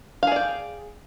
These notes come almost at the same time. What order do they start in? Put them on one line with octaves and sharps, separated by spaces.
F5 G#4 D5 G5